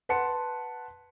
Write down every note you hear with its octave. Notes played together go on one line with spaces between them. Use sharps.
B4 F#5 A5 C6 C#7